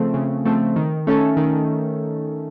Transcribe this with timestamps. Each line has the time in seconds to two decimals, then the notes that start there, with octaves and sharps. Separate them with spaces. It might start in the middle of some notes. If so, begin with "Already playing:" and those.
Already playing: C#3 F3 A3 C4
0.14 C#3
0.45 F3 A3 C4
0.76 D#3
1.07 A3 C#4 A4
1.37 D#3